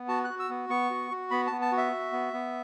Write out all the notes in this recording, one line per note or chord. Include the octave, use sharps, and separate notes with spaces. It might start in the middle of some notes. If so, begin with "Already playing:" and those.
Already playing: B3
F#4 A5
F#4 F#6
E6
B3
B3 C#6
F#4
F#4
B3 B5
B3 A5
A5
F#4
E5
F#4
B3
B3